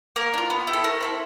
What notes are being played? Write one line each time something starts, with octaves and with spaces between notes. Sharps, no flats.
A#3 A#4
D4
F4
B3
E4 G4
A4
A3 A#4
C4 E4 A4